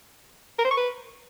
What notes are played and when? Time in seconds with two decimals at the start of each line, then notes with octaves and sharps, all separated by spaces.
0.58 A#4
0.65 C5
0.71 C#6
0.77 B4